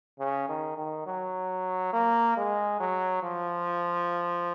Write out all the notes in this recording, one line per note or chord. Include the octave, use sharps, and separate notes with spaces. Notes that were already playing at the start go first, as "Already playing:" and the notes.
C#3
D#3
D#3
F#3
A#3
G#3
F#3
F3